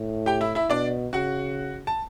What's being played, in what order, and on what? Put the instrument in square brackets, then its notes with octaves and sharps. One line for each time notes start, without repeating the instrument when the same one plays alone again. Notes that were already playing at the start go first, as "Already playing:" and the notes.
Already playing: [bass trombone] A2
[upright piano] G4 G5
E4 E5
E4 E5
[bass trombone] B2 [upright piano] D4 D5
[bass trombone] C#3 [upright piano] F#4 F#5
[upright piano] A5